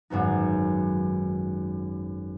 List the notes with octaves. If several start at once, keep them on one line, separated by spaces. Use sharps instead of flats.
G#1 F#2 B3 D#4